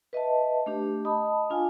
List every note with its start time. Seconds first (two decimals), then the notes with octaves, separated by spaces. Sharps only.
0.13 B4 D#5 E5 A5
0.66 A3 D4 G4
1.05 D#5 A5 B5 D#6
1.50 D4 F4 F5 G#5